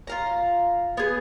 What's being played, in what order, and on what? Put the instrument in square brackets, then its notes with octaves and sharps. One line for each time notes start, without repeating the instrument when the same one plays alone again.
[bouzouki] F4 F5 A#5
B3 G#4